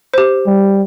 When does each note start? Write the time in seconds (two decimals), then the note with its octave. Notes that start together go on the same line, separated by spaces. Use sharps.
0.14 G4 C5
0.47 G3